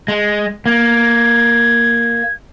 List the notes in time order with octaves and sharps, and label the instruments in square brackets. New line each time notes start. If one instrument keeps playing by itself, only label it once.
[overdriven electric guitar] G#3
[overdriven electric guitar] A#3 [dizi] G#6